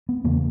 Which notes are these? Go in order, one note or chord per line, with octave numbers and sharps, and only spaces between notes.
B3
E2 C#3 A#3